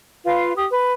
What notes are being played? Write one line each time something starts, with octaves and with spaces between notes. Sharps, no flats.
F4 B4 F5
G4 D#6
B4